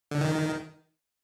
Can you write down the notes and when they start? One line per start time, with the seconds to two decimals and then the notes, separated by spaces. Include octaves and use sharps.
0.11 D3
0.21 D#3